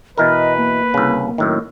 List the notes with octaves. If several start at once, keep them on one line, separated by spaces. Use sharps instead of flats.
B2 E3 A#4 B4 D#5
A#3
C2 C#3
F#2 A2 D#3